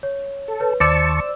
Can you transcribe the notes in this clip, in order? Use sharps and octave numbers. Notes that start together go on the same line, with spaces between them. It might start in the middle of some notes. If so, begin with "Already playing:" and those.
C#5
A4
B4 C#5
D#2 C5 D5 A5 C#6 E6 C#7